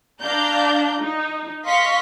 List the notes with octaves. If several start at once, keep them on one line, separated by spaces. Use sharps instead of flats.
D4 D5 F5 A#5 G6
D#4
D#5 F5 C6 C#6 B6